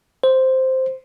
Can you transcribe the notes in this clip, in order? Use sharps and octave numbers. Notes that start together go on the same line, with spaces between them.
C5